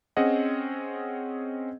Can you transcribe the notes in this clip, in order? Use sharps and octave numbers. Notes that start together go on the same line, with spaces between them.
C4 C#4 G#4 D#5 F#5